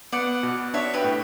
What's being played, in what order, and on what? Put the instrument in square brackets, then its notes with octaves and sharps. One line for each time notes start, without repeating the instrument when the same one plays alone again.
[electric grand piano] B3 [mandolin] D5 F#5
[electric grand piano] B2
[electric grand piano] D4 [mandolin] C#5 E5
[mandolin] G4 B4
[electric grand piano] A2